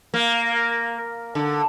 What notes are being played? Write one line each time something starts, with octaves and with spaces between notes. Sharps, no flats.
A#3
D3